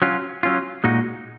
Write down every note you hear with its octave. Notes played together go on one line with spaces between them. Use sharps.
F#3 C#4 F4
F#3 C#4 F4
A#2 G#3 D#4 F#4